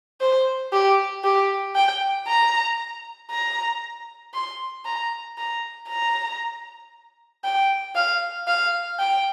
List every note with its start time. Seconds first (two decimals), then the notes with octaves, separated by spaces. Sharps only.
0.21 C5
0.72 G4
1.24 G4
1.76 G5
2.27 A#5
3.31 A#5
4.34 C6
4.85 A#5
5.38 A#5
5.89 A#5
7.44 G5
7.95 F5
8.47 F5
8.99 G5